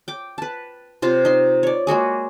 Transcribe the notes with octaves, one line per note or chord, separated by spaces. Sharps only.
G5 D6
B4 A5
C3 F4 C5
D#4 C6
C#5 D5
G#3 A#3 F#4 G#4